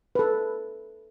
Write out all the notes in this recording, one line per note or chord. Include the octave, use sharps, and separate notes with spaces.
A4 B4